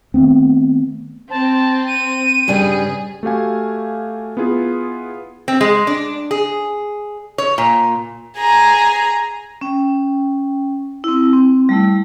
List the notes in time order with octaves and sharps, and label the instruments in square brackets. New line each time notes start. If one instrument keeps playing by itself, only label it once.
[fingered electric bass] D#3 A3 B3 C4
[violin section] C4 [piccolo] A5
[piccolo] D#7
[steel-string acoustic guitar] G2 C#3 G3 [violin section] G#4
[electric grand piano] A3 F#4 G4 F5 G#5
B3 E4 F4 G#4
[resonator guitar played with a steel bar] C4
G#3
D4
G#4
C#5
A#2
[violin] G#4 A#5
[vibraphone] C#4 G5
C4 E4
C4
G3 A3 E4